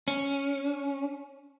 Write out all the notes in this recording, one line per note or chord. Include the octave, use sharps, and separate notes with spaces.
C#4